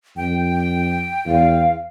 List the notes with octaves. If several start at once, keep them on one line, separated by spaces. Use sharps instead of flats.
F2 G5
E2 F5